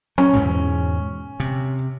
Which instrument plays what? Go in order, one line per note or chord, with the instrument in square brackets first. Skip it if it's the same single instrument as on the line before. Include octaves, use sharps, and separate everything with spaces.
[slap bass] F#3 [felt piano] C#4
[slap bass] E2 G#2 B2
C3